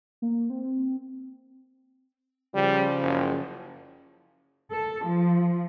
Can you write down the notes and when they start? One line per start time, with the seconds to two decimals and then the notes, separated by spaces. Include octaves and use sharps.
0.22 A#3
0.50 C4
2.55 C#3 F3 G3
3.02 F#1
4.71 A4
5.05 F3